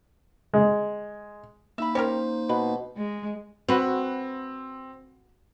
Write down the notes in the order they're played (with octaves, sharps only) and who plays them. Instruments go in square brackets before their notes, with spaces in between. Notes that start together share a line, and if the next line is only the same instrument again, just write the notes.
[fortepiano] G#3
[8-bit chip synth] A#3 D#4 [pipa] E5 B5
[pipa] C#4 G4 A#4 [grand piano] C5
[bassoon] B2 [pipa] B4
[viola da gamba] G#3
[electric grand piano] C4 [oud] F#4 B4